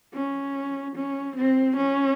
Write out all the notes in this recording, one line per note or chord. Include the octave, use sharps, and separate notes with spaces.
C#4
C#4
C4
C#4